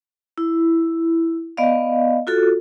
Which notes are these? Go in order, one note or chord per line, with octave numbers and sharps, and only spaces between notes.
E4
B3 D5 D#5 F5
F4 F#4 A4